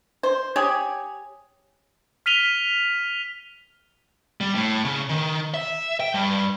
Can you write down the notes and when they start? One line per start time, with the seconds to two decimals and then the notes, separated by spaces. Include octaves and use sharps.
0.23 C5
0.56 G4 G#4 C#5
2.26 F6 B6 D#7 F7 G7
4.41 G3
4.55 A2
4.85 C#3
5.09 D#3
5.54 E5
6.00 G5
6.14 G2